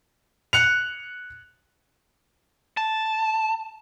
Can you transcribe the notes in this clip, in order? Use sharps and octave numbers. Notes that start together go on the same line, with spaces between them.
F#6 C#7 F7
A5